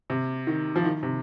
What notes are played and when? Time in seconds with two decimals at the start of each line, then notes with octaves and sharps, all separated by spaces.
0.10 C3
0.47 D#3
0.76 F3
0.84 D#3
1.03 C3